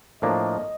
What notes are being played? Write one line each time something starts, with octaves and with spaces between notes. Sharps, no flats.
A2 F3 A#3 D4 D#5